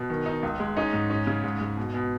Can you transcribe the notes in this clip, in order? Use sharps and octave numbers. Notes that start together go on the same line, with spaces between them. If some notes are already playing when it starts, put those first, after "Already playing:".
Already playing: B2
D#3
D#4
C#2
G#3
C#4 D#4 D#5
G#2
C#4
C#3
G#2
G#2
B2
B2